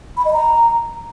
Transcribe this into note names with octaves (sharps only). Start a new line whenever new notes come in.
B5
D#5
A#5